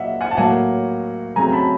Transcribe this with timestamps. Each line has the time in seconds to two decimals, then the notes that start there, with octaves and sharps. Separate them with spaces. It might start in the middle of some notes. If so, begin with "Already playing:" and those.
Already playing: A#2 F#3 A#3 D#5 E5 F#5
0.21 F#5 G#5
0.31 A5
0.37 A2 F#3 A#3 F#5 G#5
1.36 C#3 F#3 A3 C4 G#5 A#5
1.53 A5 B5